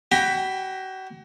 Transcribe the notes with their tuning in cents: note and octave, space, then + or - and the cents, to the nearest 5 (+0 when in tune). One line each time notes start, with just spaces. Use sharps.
F#4 +40 G5 +25 B5 +0